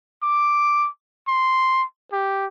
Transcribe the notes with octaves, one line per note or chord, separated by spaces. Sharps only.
D6
C6
G4